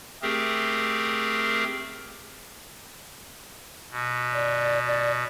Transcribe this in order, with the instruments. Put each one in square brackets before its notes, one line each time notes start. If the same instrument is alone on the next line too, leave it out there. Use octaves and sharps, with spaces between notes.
[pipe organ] A3 C4 G4 G#4 A#4
B2
[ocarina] D5
D5